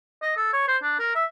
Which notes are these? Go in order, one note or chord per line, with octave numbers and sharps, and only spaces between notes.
D#5
A4
C#5
C5
D4
A#4
E5